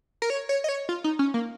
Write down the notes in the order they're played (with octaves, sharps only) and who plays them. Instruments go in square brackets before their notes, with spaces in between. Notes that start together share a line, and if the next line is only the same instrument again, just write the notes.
[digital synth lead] A#4
C#5
C#5
D#5
C#5
F4
D#4
C#4
A#3